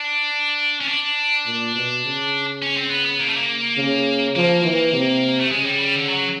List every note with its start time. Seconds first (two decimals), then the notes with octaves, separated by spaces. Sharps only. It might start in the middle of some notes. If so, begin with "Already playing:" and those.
Already playing: D4
0.80 C#4
0.88 D4
1.46 A#2
1.75 B2
2.05 C#3
2.62 C#4
2.77 C4
2.90 B3
3.06 B3
3.20 A#3
3.29 A3
3.37 A#3
3.77 C#3
4.36 F3 A#3
4.64 E3
4.93 C3
5.40 A3
5.51 C#3 G#3
5.65 G3
5.81 G3
5.95 D3
6.09 F#3